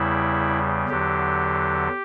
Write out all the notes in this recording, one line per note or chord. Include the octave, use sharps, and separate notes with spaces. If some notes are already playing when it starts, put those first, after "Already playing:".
Already playing: E2 C#3 G3 E4
E2 D3 F#3 G4